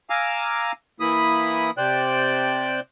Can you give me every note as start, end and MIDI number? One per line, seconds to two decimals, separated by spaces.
0.10 0.72 77
0.10 0.72 80
0.10 0.72 82
0.10 0.72 86
0.10 0.72 88
1.00 1.71 52
1.00 1.71 58
1.00 1.71 64
1.00 1.71 83
1.00 1.71 87
1.77 2.80 48
1.77 2.80 72
1.77 2.80 74
1.77 2.80 79
1.77 2.80 90